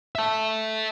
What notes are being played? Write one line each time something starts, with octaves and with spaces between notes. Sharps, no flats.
E5 A5